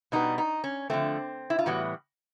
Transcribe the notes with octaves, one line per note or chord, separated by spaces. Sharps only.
B2 G3 B3 D#4
D#4
C#4
D3 F3 A3 C4
E4
F4
A2 E3 G3 B3 F#4